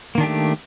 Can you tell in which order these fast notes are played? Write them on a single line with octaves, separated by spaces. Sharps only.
A#3 D#3 D4 G4 A3